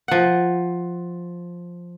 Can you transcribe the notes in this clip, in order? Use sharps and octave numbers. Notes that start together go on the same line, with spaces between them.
F3 F#5